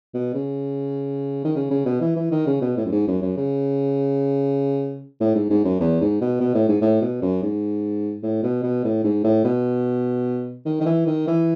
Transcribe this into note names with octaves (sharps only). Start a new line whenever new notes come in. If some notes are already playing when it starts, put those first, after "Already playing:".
B2
C#3
D#3
C#3
C#3
B2
E3
E3
D#3
C#3
B2
A2
F#2
G#2
F#2
F#2
C#3
A2
G#2
G#2
F#2
E2
G#2
B2
B2
A2
G#2
A2
B2
F#2
G#2
A2
B2
B2
A2
G#2
A2
B2
D#3
D#3
E3
D#3
E3